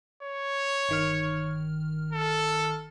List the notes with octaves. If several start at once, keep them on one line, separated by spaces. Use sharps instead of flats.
C#5
G1 D#3 F6
A4